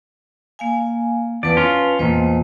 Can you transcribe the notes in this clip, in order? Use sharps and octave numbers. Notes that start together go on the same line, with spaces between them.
A#3 F5 G#5
E2 B4 D5 F5 A5
C#4 F4
E2 A#2 A3 C5 D#5